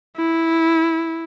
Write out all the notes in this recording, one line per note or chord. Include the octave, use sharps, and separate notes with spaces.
E4